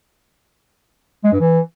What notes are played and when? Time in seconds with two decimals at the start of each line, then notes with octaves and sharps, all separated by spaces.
1.24 G#3
1.32 G2
1.40 E3